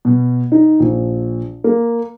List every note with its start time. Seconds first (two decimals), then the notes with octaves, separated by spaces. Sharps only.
0.05 B2
0.52 D#4
0.80 A#1
1.64 A#3